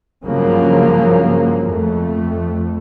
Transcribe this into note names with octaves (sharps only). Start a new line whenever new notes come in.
G2 C#3 F3 F#3 A#3
F2 A3